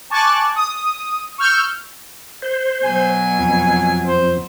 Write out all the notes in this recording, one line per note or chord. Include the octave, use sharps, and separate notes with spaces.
G#5 A5 C#6 D6 F#6 A6
D#6
C#6 E6 F6 G6
C5
B2 F#3 G#5
F2
C5